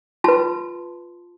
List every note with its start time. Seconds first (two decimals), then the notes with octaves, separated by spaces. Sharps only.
0.24 F4 B4 A5 C6